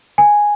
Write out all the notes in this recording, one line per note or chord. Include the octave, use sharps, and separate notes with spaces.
G#5